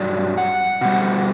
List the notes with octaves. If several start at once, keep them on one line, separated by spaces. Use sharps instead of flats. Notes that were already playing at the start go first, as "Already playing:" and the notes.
Already playing: G2 F#3 D5
F#5
B2 G3